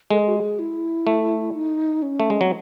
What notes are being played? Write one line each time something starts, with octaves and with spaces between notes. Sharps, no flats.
G#3 A4
G#4
F#4
G#4
E4
A3
D#4
C#4
A3
G#3
F#3 C4